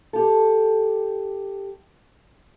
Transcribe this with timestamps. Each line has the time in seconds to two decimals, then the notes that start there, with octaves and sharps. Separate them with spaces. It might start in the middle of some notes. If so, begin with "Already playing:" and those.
0.13 G4 A4